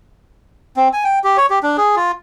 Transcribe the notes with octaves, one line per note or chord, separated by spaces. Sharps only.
C4
G#5
G5
G4
C#5
G4
D4
G#4
F4